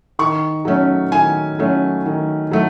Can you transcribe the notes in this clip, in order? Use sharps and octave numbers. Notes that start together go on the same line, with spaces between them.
D#3 C#6
F#3 A3 C#4
D#3 G#5
F#3 A3 C#4
D#3
F#3 A3